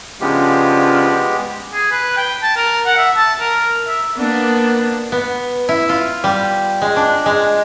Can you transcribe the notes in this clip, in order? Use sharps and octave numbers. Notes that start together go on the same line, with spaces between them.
C#3 F3 G#3 B3 D4 G4
G#4
B4
G5
A5
A#4
F#5
E5
A5
A#4
E5
A#3 B3 D4
B3
E4
F4
G3
G#3
D4
G#3